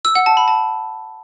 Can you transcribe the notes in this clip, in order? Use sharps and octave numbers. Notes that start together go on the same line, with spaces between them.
E6
F#5
A5
B5
A5